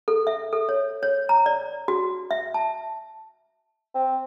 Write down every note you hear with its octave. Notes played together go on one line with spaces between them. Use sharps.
A4
E5
A4
C#5
C#5
A#5
D5
F#4
E5
A5
C4